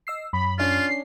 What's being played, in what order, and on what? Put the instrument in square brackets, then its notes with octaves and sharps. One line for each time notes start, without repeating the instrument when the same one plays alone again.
[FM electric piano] D#5 E6 C7
[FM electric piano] F#2 [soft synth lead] B5
[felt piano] C#4 D4 [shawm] F4 [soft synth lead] C7